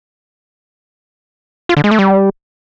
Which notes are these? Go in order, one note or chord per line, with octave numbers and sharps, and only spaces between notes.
F4
D3
G#3
A3
G3